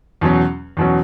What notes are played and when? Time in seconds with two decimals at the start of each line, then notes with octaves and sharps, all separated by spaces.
0.21 E2 B2 F#3 C#4
0.77 E2 B2 F#3 C#4